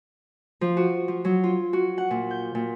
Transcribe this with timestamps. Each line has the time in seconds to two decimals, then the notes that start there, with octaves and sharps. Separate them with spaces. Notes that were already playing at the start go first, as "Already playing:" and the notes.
0.61 F3
0.77 F#4
1.08 F3
1.25 F#3
1.44 F4
1.73 F#4
1.98 F#5
2.11 A#2
2.31 G6
2.55 A#2